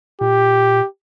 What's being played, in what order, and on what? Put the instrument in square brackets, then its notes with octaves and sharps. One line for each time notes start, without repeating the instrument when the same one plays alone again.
[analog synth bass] A#2 [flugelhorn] G4